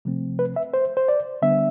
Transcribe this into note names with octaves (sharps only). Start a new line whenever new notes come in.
C3 F3 A3 C4
B4
E5
C5
C5
D5
D3 G3 B3 D4 E5